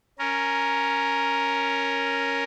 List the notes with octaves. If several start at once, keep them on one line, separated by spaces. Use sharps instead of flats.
C#4 A#4